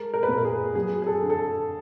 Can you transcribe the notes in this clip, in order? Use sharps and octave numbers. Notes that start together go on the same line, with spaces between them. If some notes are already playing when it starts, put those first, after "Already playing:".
Already playing: G#3 A#4
A#4
B4
A#2 A#4
G#4
F#3 G#4
G#4
A4
D3
A4